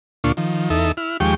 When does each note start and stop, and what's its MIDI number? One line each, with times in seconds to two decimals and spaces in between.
0.24 0.32 38
0.24 0.32 46
0.24 0.32 62
0.24 0.32 65
0.24 0.32 85
0.37 0.69 51
0.37 0.69 53
0.70 0.92 40
0.70 0.92 63
0.70 0.92 69
0.70 0.92 76
0.97 1.17 64
0.97 1.17 89
1.20 1.35 39
1.20 1.35 53
1.20 1.35 56
1.20 1.35 67
1.20 1.35 79
1.20 1.35 85